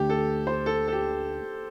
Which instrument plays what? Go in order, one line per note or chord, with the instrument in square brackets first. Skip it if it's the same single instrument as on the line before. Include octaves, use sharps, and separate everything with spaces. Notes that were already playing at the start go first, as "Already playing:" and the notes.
Already playing: [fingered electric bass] D2 D3 A3 D4 [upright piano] G4
[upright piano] A4
C5
A4
A4
G4